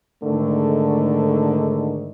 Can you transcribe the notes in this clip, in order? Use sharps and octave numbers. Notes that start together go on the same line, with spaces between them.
G#2 D3 D#3 A3